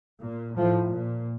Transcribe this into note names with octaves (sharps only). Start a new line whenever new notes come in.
A#2
A2 F3
A#2